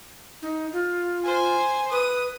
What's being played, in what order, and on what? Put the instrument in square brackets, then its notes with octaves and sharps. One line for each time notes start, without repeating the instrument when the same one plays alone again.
[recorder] D#4
F4
[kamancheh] C5 G#5
[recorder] B4 [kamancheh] D#6